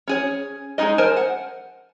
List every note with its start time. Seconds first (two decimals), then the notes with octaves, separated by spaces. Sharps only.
0.08 C#4 G#4 C#5
0.78 G#3 A3 D#4 G#4 D#5
0.98 A#4 C5 G#5 A5
1.17 F#5